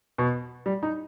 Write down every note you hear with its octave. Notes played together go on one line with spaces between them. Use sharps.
B2
G3
D#4